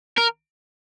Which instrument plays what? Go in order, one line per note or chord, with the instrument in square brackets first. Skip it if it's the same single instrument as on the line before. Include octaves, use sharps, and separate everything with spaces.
[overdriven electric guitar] A#4